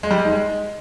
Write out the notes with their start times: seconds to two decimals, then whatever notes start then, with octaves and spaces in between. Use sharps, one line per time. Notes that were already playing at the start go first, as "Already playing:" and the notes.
0.03 G#3
0.11 G3
0.18 G#3
0.25 D#4
0.32 G#3